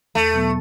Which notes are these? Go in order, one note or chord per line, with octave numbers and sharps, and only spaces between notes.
E2 A3
B2 F#3 B3